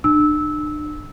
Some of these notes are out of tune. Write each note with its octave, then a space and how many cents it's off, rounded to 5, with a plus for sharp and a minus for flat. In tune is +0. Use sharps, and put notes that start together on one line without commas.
D4 +40 E6 -15